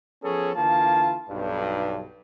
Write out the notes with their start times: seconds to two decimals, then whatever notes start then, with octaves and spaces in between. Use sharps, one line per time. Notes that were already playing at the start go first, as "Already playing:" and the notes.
0.23 F3 B3 C#4 G#4 A4 C#5
0.56 D3 E3 A#3 F4 A5
1.29 B1 G2